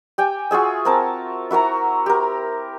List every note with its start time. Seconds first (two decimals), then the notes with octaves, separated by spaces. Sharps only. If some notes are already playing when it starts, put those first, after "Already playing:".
0.18 G4 G5 G#5
0.51 F4 F#4 G#4 E5
0.85 C4 A#4 A5
1.51 E4 F#4 A#4 A#5
2.06 G4 A#4